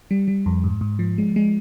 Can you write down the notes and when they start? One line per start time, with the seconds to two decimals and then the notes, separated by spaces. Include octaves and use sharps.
0.11 G3
0.28 G3
0.46 F2
0.64 G#2
0.81 G#2
0.99 F3
1.18 G#3
1.36 G#3